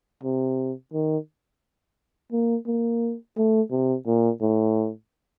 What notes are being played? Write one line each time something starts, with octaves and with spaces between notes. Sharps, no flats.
C3
D#3
A#3
A#3
A3
C3
A#2
A2